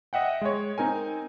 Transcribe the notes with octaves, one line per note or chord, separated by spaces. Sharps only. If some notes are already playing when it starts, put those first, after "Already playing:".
D#5 E5 F#5 G5
G#3 C#5
C4 D#4 A#4 G#5